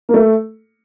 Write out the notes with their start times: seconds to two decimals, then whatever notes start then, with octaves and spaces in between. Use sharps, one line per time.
0.09 A#3
0.14 A3